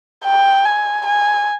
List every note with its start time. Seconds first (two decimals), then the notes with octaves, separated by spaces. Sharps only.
0.24 G5
0.65 G#5
1.06 G#5